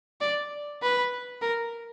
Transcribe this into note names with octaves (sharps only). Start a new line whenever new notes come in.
D5
B4
A#4